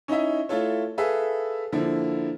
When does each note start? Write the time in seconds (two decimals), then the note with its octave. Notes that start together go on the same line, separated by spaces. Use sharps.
0.08 C#4 D#4 E4 D#5 E5
0.49 A3 E4 F4 A4 C#5
0.98 G#4 A4 B4 E5 F5
1.73 D3 F3 A#3 E4